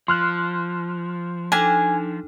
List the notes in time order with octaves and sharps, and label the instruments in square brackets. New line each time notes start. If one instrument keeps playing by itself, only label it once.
[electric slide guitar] F3 [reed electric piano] C6 F6 F#6
[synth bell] D4 D#4 A4 [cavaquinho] G#5